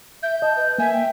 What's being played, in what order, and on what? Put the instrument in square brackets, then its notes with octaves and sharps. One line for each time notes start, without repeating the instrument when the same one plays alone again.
[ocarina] E5 [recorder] G6
[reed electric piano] D#5 [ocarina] A5
[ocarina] B4
[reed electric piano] A#3 [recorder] E5 [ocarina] G#5
[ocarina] G5